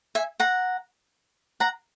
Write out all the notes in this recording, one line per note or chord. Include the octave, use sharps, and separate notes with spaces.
E5 G#5
F#5 A#5
F#5 A#5